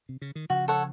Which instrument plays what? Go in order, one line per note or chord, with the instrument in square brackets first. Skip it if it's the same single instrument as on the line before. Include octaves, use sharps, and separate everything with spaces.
[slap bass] C3
C#3
D#3
[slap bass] C#3 F3 [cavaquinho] F#4
[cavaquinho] A4 C#5 F#5